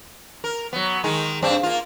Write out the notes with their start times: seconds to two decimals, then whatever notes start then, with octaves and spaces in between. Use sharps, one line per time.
0.44 A#4
0.73 F#3 B3
1.04 D#3 G#3 D#4
1.43 G2 C4 D4
1.63 A#3 F4